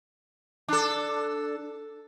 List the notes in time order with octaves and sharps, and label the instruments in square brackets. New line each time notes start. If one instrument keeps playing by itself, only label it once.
[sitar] D4 A4